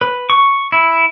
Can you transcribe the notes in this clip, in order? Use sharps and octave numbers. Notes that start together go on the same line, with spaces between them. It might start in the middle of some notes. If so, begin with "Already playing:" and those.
B4
C#6
E4